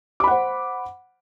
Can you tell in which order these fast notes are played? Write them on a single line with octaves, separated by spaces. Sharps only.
D6 B5 F#5 C5